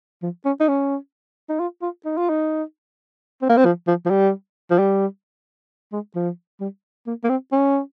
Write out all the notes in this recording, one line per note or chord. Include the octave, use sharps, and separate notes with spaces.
F3
C#4
D#4
C#4
D#4
F4
F4
D#4
F4
D#4
C4
A#3
C4
F3
F3
F3
G3
F3
G3
G#3
F3
G3
A#3
A#3
C4
C#4